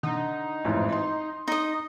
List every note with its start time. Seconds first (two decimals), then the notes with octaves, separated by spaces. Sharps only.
0.03 D3 D#4
0.65 A1 F2 G#2
0.92 C6
1.48 D#4 D#5